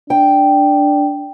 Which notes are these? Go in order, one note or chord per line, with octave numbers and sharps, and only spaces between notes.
D4 G5